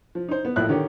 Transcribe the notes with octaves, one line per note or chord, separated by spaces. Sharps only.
F3
D#4 C5
B3
A#1 A2 E4 F#6
D3 D#3 G4 C#5